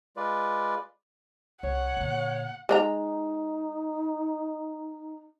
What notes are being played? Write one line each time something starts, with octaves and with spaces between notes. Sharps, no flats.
G#3 F4 B4 D5
C2 C#5 F#5
A#2 D3
G#3 D#4 D5 A#5